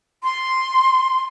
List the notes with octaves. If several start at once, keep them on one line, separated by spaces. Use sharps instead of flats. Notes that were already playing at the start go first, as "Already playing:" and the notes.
C6